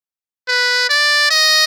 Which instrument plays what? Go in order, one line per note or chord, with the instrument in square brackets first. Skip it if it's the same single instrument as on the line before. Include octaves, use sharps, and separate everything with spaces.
[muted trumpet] B4
D5
D#5